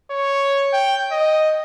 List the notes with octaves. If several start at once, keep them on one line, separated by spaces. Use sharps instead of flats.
C#5
G5
D#5